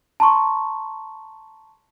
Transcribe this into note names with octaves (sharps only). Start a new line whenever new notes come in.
A5 A#5 C6 C#6